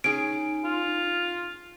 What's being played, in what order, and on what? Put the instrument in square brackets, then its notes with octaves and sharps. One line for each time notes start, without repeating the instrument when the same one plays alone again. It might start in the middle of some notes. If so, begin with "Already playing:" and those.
[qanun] C#4 G#4 [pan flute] D#4 [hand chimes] D7
[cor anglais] F4